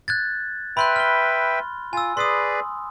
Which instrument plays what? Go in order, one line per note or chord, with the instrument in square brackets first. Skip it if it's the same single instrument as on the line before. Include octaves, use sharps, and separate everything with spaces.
[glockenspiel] F#6 G#6 A6
[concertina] B4 E5 G5 [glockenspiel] B5 C6 F#6
[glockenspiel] F6 G7
[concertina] F4 [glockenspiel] G#5 E6
[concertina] G#4 B4 D5 [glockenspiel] C6 D#6